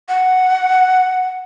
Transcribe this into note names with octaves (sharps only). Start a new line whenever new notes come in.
F#5